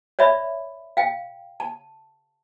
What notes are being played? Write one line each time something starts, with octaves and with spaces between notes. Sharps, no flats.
C#5 D5 E5 B5
F5 G5
A5